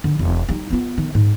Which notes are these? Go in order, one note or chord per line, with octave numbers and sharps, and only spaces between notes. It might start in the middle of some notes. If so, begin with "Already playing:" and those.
D3
E1
G3 D#4
B3 F4
D#3
G#2